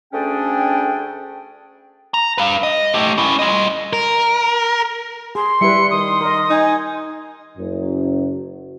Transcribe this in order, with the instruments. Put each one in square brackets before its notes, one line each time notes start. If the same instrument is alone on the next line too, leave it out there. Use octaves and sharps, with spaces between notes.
[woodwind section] D2 A3 C#4 D4 G#4 G5
[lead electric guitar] A#5
B4 F5
D#5
A3 G4
C#4 E4
F4 D#5
A#4
[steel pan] G#4 [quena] C6
[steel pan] G3 B4 [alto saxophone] E4 [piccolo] C#7
[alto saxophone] D#3 [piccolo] D#6
[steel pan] A#4 D#5
[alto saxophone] D#4 [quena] G#5
[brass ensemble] F#1 F#2